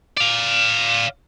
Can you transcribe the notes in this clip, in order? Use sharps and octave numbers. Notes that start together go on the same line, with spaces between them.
D5 F5